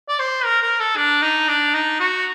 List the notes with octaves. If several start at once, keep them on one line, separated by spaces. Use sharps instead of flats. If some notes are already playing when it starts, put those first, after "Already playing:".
D5
C5
A#4
A#4
A4
D4
D#4
D4
D#4
F#4